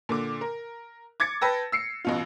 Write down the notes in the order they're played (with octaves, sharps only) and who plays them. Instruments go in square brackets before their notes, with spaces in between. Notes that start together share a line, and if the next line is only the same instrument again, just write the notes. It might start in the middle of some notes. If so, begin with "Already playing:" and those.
[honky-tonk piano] A#2 D3 D6
A#4
D6 G#6 A6 C#7
B4 G5 A5 E6 A#6
E6 C7 C#7
A1 B2 F4